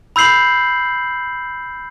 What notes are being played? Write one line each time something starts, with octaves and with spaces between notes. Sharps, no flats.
B5 E6 G6 C7 F#7